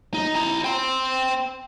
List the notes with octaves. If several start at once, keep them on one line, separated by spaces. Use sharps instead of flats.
D#4
E4 A#5
G5 C6